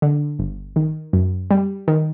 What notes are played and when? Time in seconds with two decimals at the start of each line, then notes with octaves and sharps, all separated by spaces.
0.02 D3
0.39 G1
0.76 D#3
1.13 F#2
1.51 G3
1.88 D#3